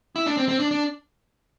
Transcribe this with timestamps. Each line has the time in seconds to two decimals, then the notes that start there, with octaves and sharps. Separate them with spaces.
0.16 E4
0.26 D4
0.37 C4
0.49 C4
0.59 D4
0.71 D4